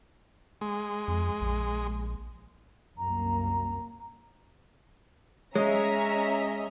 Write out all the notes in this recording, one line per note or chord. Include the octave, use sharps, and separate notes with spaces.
G#3
F2
A#1
C2 F#2 A#3 A#5
G#3 C#4 C#5 D#5 E5 A#5